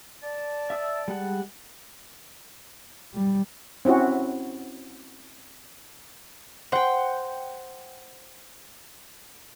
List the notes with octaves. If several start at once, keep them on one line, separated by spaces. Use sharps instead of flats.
D5 A5
E5 D#6 E6
G3 G#3 F#5
G3
C4 C#4 E4 F#4
C5 F#5 G5